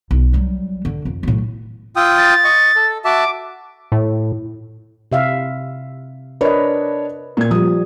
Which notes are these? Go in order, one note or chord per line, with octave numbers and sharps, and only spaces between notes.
B1
F#3 G3
D3
F2
A2 F#3
F4 G5 D#6 E6
A6
D#5 C#6
A4
F#4 E5 A5 D6
A2
C3 E5 F5
D4 A#4 B4 C#5 D#5
A#2 G#6
F3 G3 D#6